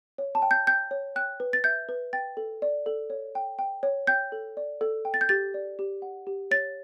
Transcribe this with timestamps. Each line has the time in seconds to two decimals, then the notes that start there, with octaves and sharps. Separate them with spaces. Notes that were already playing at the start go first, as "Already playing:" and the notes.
0.18 C#5
0.35 A5
0.42 G5
0.51 G6
0.67 G5 G6
0.91 C#5
1.16 G5 F#6
1.40 B4
1.53 A6
1.64 E5 G6
1.89 B4
2.13 G5 A6
2.37 A4
2.62 D5
2.86 A4
3.10 C#5
3.35 G5
3.59 G5
3.83 C#5
4.07 G5 G6
4.32 A4
4.57 D5
4.81 A4
5.05 G5
5.14 A6
5.21 G6
5.29 G4 A6
5.54 D5
5.79 G4
6.02 F#5
6.27 G4
6.51 C#5 A6